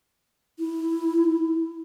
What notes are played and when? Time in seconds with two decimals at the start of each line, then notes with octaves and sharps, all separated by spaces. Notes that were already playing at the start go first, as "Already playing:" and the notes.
0.59 E4